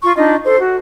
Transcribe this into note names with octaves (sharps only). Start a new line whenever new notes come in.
F4 C#6
D4 D#4 F4 D#5
A4 C5
F#4